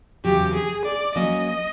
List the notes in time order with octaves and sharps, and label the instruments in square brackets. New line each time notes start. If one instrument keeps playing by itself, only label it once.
[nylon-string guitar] E2 C#3 F#3 [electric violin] G4
[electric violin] G#4
D5
[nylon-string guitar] F#3 A#3 C#4 [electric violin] D#5